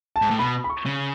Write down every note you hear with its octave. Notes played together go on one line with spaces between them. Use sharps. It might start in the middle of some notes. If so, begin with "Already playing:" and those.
A5
G#2
A2
B2 B5
B5
C#6
C#3